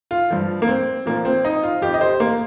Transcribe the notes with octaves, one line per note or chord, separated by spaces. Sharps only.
F4
G2 F3
A#3
C4
A#2 F3 A#3
C4
D#4
F4
F2 F3 G4
D#5
C5
A#3